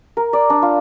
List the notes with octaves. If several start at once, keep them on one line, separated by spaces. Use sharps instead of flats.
A#4
D5
D4
F4